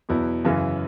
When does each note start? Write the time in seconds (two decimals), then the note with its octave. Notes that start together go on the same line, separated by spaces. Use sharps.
0.09 E2 B2 F#3 B3 E4
0.45 F#2 C#3 E3